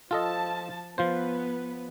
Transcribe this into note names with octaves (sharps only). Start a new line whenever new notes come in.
F3 F4 A4 D#5 A5
F3 B3 F4 B4 C5